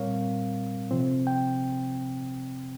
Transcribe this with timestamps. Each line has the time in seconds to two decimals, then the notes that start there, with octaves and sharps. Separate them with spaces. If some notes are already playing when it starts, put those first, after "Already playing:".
Already playing: A#2 G3 C4 A#4 C#5 F5
0.91 C3 F3 C4
1.27 G5